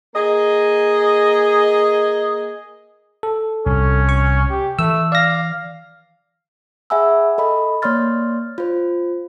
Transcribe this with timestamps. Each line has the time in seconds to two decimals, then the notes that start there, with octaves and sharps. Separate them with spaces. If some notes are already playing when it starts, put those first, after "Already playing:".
0.15 A#3 G#4 D#5
3.23 A4
3.66 C2 C#4
4.09 C#6
4.50 G4
4.79 E3 A3 E6
5.12 D5 F5 A#6
6.90 G#4 E5 F#5 G#5 B5 E6
7.38 A4 D#5 B5
7.82 A#3 C#5 D5 C6 F6 A6
8.58 F4 C5